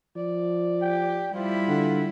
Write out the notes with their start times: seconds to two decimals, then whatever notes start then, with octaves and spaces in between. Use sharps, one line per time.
0.16 F3 D5
0.82 G4 G5
1.34 G3 E4 F4 C5
1.69 D3 F#5